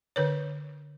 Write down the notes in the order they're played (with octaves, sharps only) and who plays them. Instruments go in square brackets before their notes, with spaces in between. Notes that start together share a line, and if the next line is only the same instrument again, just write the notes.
[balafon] D3 B4 C#5